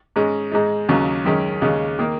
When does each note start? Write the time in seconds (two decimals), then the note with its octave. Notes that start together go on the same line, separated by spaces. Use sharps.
0.16 G#2 G#3 C#4
0.52 G#2 G#3 D#4
0.89 D#2 C#3 F#3 C#4
1.25 F#2 D#3 G#3 C#4
1.61 D#2 C#3 G#3 C#4
1.99 D#3 A#3